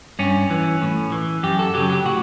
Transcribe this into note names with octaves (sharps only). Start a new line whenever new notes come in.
G2 C#4
E3
A2
E3
F#2 G4
A4
C#3 F#3 G4
G4
A2 F#4